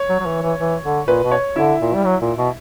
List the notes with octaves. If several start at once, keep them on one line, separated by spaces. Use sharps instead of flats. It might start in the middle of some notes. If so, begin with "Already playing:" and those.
Already playing: C#5
F#3
F#3
E3
E3
E3
D3
A#2 B4
B2
C#5
D3 E4 E5
A#2
G3
F#3
A#2
B2